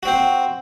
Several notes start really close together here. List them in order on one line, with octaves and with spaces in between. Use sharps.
F#4 C4 C5